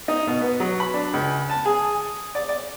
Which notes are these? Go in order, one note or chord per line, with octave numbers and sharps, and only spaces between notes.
D#4
B2
B3
F#3
B5
D4
C#2
A5
G#4
D5
D5